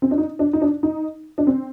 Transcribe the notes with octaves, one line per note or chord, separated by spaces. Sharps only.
C4
D4
D#4
D4
D#4
D4
D#4
D4
C4